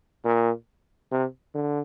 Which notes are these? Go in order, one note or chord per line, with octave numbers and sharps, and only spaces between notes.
A#2
C3
D3